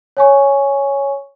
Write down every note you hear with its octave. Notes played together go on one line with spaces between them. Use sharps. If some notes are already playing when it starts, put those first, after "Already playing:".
C#5 G#5 C#6